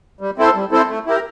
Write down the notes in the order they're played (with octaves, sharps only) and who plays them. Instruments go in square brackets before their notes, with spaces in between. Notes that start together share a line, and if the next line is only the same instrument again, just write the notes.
[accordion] G3
C4 E4 A4 C5
G3
C4 E4 A4 C5
A3
E4 G4 A#4